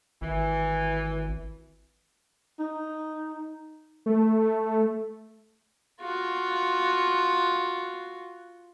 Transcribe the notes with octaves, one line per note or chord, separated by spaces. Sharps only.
G#1 E3
D#4
A3
F4 F#4